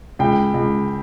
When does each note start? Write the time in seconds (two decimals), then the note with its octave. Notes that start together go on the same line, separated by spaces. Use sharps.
0.19 C#2 G5
0.54 C#2